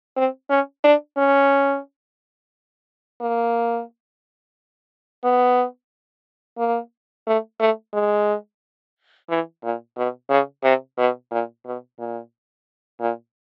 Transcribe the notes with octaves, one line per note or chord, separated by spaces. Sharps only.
C4
C#4
D4
C#4
A#3
B3
A#3
A3
A3
G#3
E3
A#2
B2
C#3
C3
B2
A#2
B2
A#2
A#2